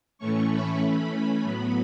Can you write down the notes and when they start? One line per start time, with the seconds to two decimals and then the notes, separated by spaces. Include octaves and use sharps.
0.18 A2 E3 A3 C#4 C#6
0.50 B5
0.81 E3 A3 C#4 B5
1.43 A2 F#3 B3 B5